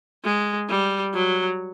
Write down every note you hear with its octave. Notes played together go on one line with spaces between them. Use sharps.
G#3
G3
F#3